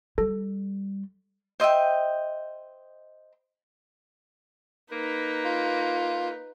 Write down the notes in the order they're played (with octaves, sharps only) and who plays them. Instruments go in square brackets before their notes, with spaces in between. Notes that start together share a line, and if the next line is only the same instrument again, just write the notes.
[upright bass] G3 [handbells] A4
[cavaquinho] C5 D#5 E5 G5
[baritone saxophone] A#3 [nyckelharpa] D#4 B4
[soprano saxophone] F4